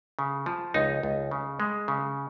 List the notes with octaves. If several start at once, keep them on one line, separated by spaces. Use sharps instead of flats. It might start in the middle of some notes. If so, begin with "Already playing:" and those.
C#3
F3
C#2 D#4
C#2
C#3
G#3
C#3